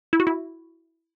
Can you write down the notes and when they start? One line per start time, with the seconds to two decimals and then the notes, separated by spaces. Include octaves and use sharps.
0.13 E4
0.20 F#4
0.27 E4